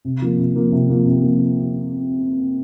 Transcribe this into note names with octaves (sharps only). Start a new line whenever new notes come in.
C3
F3 A#3
C3
F3 A#3
C3
F3 A#3
C3
F3 A#3